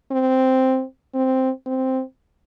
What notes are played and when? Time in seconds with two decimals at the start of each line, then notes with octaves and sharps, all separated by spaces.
0.11 C4
1.14 C4
1.66 C4